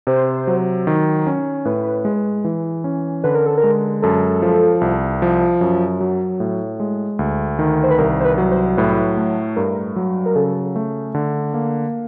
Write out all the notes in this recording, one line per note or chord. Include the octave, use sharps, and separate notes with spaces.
C3 C5
F#3
D#3
C#4
A2 B4
G#3
E3
C#4
D3 B4
A#4
A4
A#4
G#3
F#2 A4
F3
C2
F3
F#2
F#3
A2
G#3
D2
D#3
C5
B4
C2 A#4
C5
B4
F#3
C5
A2 B4
A3
G2 A#4
F#3
A#4
C#3 A4
A3
D3
A#3